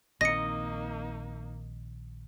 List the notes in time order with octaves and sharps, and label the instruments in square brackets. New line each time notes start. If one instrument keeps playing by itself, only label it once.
[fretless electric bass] A#1 D#3 C4 [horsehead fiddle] A#3 D#4 [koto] D#5 [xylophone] A#6 C#7